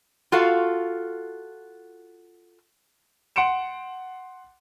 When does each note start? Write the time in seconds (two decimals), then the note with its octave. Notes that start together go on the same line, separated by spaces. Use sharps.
0.32 F4 F#4 A4 F5
3.36 F#5 C6 C#7 D7 E7